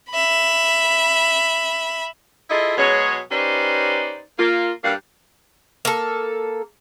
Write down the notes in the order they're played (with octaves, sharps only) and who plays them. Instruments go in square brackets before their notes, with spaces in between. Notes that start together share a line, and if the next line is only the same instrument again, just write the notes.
[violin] E5 B5
[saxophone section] E4 F4 G#4 A4 D#5
B2 F#3 G#3 G#4 C#5
C#4 D#4 G4 B4 C5 D5
A#3 F4
G2 G3 A#3 D4 F5 F#5
[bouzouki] A#3 A4